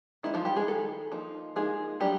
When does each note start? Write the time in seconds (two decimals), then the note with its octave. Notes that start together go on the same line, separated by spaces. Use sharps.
0.23 D#3 G#3 C4 D#4 E4
0.34 F3 F4
0.45 G3 G4
0.56 G#3 G#4
0.68 D#3 G#3 A4
1.12 F3 A#3 D#4
1.56 F3 G#3 A#3 D#4 G#4
2.00 F#3 G3 A3 D4 G4